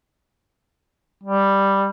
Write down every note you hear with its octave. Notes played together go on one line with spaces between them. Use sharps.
G3